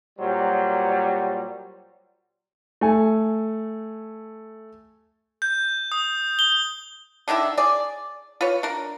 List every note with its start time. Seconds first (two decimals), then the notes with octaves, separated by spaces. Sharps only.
0.19 A#2 F#3 G3 C5
2.81 A3 G#5
5.42 G6
5.92 D#6
6.39 G7
7.28 D3 D#3 D4 E4
7.58 G#4 D5
8.41 F4 B4 C#5
8.63 D4 A#4